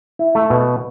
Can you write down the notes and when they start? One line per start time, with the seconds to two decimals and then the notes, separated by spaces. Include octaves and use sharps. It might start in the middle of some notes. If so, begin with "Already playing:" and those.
0.19 E4
0.35 A3
0.50 B2